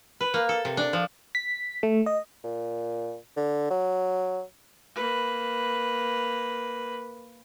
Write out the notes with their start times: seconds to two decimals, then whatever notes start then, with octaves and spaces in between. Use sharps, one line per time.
0.21 B4
0.34 A#3
0.49 A4
0.65 C3
0.77 D4
0.93 F3
1.35 B6
1.83 A3
2.06 D#5
2.44 A#2
3.36 D3
3.70 F#3
4.95 A#3 B4